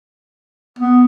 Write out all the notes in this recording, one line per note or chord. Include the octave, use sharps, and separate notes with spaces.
B3